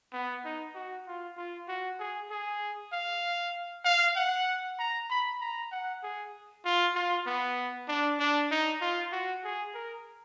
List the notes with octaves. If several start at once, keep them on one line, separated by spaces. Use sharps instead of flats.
B3
D#4
F#4
F4
F4
F#4
G#4
G#4
F5
F5
F#5
A#5
B5
A#5
F#5
G#4
F4
F4
B3
D4
D4
D#4
F4
F#4
G#4
A#4